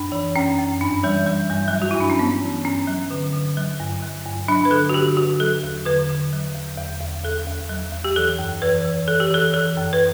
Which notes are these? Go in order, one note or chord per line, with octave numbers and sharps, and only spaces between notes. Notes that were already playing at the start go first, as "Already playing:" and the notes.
Already playing: F#2 D4
E3
F#2 C#4
F#2
G2 D4
E3 G3
E3 G3
G2 G3
F#3
G2 G3
F#4
E4
G2 D4
C#4
G2 B3
E3
G2 C#4
F#3
D3
D3
F#3
G2
F#3
G2
F#3 D4
B4
D3 A4
F#4
D3 G4
D3 F#4
F#3 A4
E2
D3 B4
D3
F#3
E2
E2
E2
E2 A4
E2
F#3
E2
G4
E3 A4
F#2
E3 B4
E3
E3 A4
G4
E3 A4
E3 A4
F#2
B4